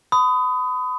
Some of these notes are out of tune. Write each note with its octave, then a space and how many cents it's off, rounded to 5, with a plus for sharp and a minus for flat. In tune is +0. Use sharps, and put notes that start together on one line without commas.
B5 +35 D#6 +5